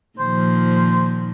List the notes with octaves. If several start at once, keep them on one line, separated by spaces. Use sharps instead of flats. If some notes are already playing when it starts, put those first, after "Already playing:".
A#2 D#3 F3 C5